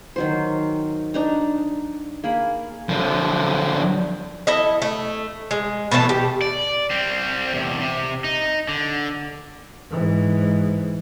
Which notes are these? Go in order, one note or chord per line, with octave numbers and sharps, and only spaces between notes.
D#3 F#3 C5
D4 D#4 A#5
A#3 G#4 B5
D3 F3
E4 A4 D#5
A3
G#3
B2 E3 A3 A5
G4
D5
G3 C4
E2 C3
C3
D#4
D3
G#2 E3